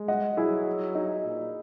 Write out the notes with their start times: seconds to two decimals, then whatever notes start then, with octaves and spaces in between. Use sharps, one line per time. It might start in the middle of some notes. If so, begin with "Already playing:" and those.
Already playing: G#3
0.08 D#5 F#5
0.37 F#3 E4 G#4
0.95 D#4
1.24 A#2